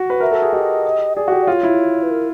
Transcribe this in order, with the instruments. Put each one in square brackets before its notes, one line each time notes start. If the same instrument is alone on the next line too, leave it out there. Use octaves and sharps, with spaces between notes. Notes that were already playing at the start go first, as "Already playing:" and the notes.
Already playing: [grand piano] F#4
B4
[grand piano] A#4 [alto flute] E5
[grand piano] A4
G#4
[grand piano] G4 [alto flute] D#5
[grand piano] G#4 [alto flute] D5
[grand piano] F#4
G4
[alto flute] D5
[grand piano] F4 [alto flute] C#5
[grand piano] E4
[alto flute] B4
A#4